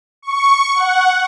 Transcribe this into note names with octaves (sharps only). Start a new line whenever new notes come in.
C#6
F#5